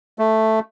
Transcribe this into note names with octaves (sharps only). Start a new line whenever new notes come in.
A3